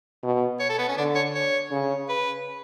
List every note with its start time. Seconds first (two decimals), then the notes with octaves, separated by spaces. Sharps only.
0.23 B2
0.60 C#5
0.69 A4
0.78 B3
0.88 C#4
0.97 D3 D4
1.15 C#5
1.35 C#5
1.71 C#3
2.09 B4